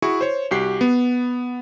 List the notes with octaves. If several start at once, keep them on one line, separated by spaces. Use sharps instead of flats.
E4 F#4 G#4 C#6 D#6
C5 C#5
C2 F#4 G4 C7
B3